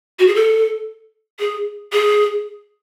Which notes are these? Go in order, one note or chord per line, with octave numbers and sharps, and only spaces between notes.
F#4
G#4
A4
G#4
G#4